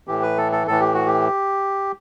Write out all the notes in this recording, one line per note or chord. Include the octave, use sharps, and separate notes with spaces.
A2 E3 G4
B4
A4
A4
A2 E3 A4
G4
F#4
G4